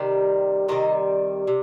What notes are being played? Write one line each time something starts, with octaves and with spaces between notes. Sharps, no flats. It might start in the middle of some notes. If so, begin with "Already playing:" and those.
Already playing: C3 D#3 G3
C3 D#3 G3 D#5
C3